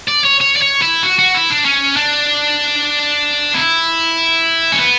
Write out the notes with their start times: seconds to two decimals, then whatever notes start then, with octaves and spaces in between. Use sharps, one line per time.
0.09 D5
0.25 C#5
0.41 C#5
0.56 D5
0.61 C#5
0.82 E4
1.03 F#4
1.19 F#4
1.34 E4
1.50 D4
1.65 C#4
1.97 D4
3.54 E4
4.72 C#4
4.80 B3